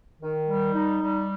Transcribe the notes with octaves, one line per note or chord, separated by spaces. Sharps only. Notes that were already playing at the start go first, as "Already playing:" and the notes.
D#3
G3
D#4
G3